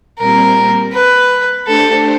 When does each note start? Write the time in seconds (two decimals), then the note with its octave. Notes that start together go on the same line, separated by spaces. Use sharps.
0.18 A#2 G3 C4 A#4
0.92 B4
1.66 A3 D4 G4 A4 C5